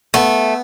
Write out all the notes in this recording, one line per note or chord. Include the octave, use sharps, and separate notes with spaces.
A3 B3